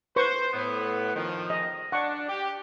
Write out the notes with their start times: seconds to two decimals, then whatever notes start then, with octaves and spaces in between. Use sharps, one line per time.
0.16 B4 C5 C#6
0.53 A2 B3
1.15 D#3 F3
1.50 D#5
1.92 D4 F#5 C#6
2.29 G4